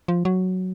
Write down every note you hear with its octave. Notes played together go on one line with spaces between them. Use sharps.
F3
F#3